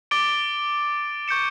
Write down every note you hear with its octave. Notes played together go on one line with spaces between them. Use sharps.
D6 A6 D7 G7
C#6 G6 C#7 E7